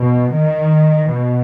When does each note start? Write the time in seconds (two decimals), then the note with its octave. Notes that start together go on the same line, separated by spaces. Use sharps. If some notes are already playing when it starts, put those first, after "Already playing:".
Already playing: B2
0.31 D#3
1.10 B2